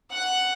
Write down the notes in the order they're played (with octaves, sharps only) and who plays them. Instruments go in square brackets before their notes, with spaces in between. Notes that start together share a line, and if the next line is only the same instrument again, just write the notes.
[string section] F#5